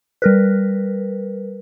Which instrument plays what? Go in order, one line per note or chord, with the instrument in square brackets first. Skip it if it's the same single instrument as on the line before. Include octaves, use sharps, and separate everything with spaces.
[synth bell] G3 A#4 B4